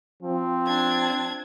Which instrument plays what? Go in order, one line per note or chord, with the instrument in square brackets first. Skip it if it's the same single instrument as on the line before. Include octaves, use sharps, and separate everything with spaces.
[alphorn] F3 [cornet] C4
[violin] D4 G#6